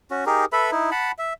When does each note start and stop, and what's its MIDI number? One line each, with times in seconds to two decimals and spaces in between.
0.11 0.25 61
0.11 0.25 66
0.26 0.45 63
0.26 0.45 67
0.26 0.45 68
0.26 0.45 70
0.53 0.71 69
0.53 0.71 71
0.53 0.71 76
0.53 0.71 83
0.72 0.90 63
0.72 0.90 64
0.91 1.12 78
0.91 1.12 81
0.91 1.12 83
1.19 1.33 76